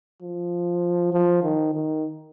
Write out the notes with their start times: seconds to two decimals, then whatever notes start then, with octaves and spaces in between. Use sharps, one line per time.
0.22 F3
1.13 F3
1.43 D#3
1.74 D#3